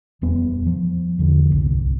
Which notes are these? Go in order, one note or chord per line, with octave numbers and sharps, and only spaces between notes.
D#1 F2 G3 B3
F3
E2 D3
D1 G1 C2